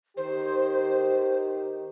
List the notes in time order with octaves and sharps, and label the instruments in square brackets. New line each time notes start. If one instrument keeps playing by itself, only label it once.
[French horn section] D#3 G4 [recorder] C5